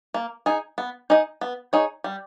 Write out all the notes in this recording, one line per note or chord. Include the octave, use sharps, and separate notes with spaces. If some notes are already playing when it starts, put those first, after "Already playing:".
A#3
D#4 G#4
B3
D#4 G#4 D#5
B3
D#4 G#4 C#5
G3